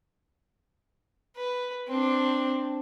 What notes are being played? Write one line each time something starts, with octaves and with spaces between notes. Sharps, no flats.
B4
C4 D4